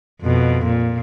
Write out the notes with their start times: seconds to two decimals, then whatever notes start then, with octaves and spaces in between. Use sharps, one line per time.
0.22 F2 B2
0.65 A#2